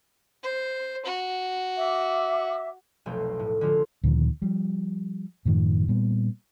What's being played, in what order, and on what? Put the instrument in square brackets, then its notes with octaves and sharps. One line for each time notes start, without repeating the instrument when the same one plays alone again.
[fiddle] C5
F#4
[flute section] E5 D6
[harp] F1 B1 B2 A3 C5 F5
A2
D3 F3 G#3 F4
[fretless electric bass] D2 A#2 D#3 F3
F3 G3
F#2 A2 D#3 F3
A#2 G3 B3